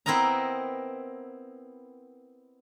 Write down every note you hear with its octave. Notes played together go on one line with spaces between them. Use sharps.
B3 C4 E4 A#4 D#5 A#5